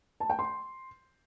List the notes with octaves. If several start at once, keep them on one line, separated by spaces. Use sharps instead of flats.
A5
G5
C6